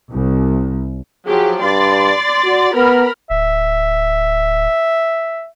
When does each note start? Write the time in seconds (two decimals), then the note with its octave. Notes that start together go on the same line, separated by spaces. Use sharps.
0.12 C2
1.28 F3 F#3 G4 G#4
1.63 G2 D5 C6 A6
2.45 F#4
2.75 B3 A#4 B5 F6
3.30 D1 E5